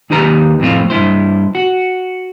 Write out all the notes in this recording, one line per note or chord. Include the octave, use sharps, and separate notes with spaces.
D#2 D#4 G4 B4 A#5
F2 A2 C4 F4
G2 C3 E4 C5
F#4